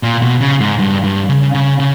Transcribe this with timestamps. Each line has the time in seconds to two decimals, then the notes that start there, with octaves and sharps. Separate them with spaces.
0.03 A#2
0.22 B2
0.41 C#3
0.60 G#2
0.79 G2
1.04 G2
1.29 C#3
1.54 C#3
1.80 C#3